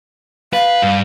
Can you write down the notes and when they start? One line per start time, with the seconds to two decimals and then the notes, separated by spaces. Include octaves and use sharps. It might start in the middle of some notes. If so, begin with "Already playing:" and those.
0.53 B4 F5
0.82 G2